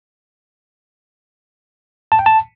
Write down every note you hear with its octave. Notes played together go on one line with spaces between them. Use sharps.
A5
G5
A5